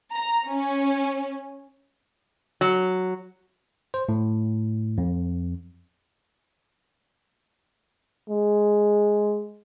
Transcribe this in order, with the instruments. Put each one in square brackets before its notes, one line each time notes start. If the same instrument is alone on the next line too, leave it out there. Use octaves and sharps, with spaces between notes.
[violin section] A#5
C#4
[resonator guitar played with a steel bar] F#3
[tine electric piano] C5
A2
F2
[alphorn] G#3